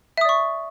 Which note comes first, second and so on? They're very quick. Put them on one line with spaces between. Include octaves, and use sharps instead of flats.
E5 D#6 D5 C#6